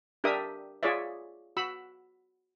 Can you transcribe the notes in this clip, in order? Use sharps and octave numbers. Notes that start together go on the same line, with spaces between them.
D4 G4 A#4 E5 D#6
F4 G#4 C#5 D5 E5
F#4 B5 E6